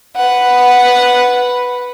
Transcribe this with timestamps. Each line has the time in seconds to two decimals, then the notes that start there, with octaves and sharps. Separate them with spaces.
0.15 B4 F#5